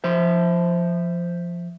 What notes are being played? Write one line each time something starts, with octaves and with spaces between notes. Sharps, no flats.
F3 C5 E5